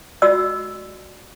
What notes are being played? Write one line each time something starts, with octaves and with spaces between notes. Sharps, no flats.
F4 F#4 D5 D#5 E6